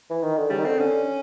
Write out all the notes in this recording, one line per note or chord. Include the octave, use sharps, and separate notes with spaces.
E3
D#3
D3
C#3 G3
D#3
D3 C4
D3 C#4